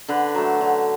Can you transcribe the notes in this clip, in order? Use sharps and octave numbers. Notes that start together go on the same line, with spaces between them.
D3 B4
F#3 A3
D3